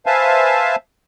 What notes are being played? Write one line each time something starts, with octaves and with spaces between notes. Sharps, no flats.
B4 C5 E5 F5 G#5 A5